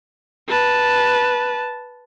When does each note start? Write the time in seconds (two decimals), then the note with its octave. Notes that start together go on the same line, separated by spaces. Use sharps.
0.48 B4 A5